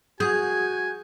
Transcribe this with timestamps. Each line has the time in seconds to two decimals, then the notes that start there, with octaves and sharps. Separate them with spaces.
0.20 F#4 G#4 G#5 G6 G#6